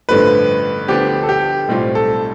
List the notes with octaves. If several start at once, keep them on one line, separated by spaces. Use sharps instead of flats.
A1 G2 D3 F3 A3 B4
D2 D3 F3 B3 D4 G4
A4
G4
B1 A2 G3 C4 F4
A4